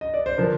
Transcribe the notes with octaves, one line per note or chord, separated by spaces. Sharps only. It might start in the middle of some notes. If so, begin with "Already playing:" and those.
D#5
D5
C5
D3 F3 A#4